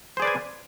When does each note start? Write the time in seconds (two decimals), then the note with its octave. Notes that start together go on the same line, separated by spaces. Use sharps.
0.17 C5
0.20 G#4
0.22 D5
0.25 B4
0.27 G#5